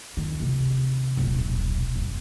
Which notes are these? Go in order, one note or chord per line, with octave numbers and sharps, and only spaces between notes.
D#3
C3 D#3
D#1 B1
F#1